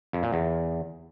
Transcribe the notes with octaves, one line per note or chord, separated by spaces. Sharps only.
F2
A#2
E2